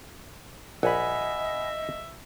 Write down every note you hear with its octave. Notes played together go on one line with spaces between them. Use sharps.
A#1 D#5 E5 F#5 G#5 B5